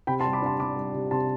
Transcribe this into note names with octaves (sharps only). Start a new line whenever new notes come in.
C3 G5 B5
A5 C6
G3
B5 D6
D4 A5 C6
C3 B5 D6
G3
C3
C3 A5 C6